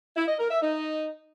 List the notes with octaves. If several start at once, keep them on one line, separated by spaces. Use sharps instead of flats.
E4
D#5
A#4
E5
D#4